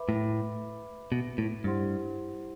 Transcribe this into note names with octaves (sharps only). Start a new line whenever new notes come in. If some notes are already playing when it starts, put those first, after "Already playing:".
Already playing: B4 E5 B5 D6
A2
B2
A2
G2 E4 G4 C5 F#5 C6